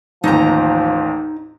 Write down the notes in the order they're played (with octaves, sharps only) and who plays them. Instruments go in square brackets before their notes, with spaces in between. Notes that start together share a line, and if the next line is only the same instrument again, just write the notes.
[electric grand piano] A1 D#2 [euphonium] F3 [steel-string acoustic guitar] D#4 A#5